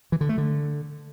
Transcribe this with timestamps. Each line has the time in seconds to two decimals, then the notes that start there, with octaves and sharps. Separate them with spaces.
0.12 E3
0.21 D3
0.29 A3
0.38 D3